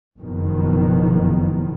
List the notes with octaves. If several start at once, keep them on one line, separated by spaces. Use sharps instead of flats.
F#1 F2 B2 D#3